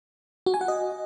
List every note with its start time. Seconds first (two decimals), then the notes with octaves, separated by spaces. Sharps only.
0.46 F#4
0.54 G#5
0.61 F#5
0.68 D#5